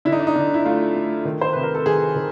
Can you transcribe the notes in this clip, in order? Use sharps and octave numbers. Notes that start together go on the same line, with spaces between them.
D3 E4
D#4
D4
D#4
D3
E4
A3 F4
A3
D#3
C5
C3 B4
A#4
A4
D#3 G#4
D#3